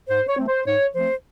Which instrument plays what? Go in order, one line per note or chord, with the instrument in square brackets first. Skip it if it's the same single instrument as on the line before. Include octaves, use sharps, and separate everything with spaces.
[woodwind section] G#2 C5
C#5
F3 A3 C4
C5
G#2 C#5
F3 A3 C4 C5